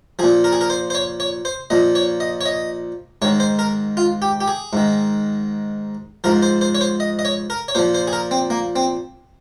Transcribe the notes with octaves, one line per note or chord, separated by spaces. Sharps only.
A#2 F3 G#4
A#4
G#4
A#4
C5
C5
C#5
C#5
C5
A#2 F3 D#5
C#5
D#5
C#5
D#5
G#2 D#3 C#5
C5
A#4
F4
G4
G4
G#4
G#2 D#3
G#2 F3 A#4
C5
C5
C#5
C5
D#5
D#5
C#5
A#4
C#5
A#2 F3 C5
C5
G#4
A#4
C4
A#3
C4